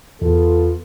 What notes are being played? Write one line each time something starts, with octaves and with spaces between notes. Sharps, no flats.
E2 B3 F4 A4